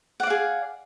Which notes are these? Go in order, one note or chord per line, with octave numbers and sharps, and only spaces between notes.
G#4 D5 F5 F#5